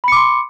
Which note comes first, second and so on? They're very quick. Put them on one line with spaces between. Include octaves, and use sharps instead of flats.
B5 C#7 D6 C6